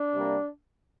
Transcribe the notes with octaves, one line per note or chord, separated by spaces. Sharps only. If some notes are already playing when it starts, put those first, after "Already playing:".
Already playing: D4
C3 G3 A#3